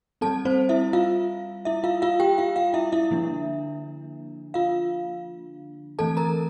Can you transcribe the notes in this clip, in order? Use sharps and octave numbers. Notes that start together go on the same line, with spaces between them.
G3 C4 A4 A5
C4 C5
E4 E5
F4 F5
E4 E5
F4 F5
F4 F5
G4 G5
F4 F5
F4 F5
E4 E5
E4 E5
D3 F3 A#3 D4
F4 F5
E3 A3 C4 A4 A5
A#4 A#5